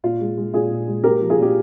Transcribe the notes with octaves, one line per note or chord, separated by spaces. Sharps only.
A#2 F4
G#3
G#3
A#2 F4 G#4
A#2
G#3
A#3 G4 A#4
F3
F4 G#4
A#2 G4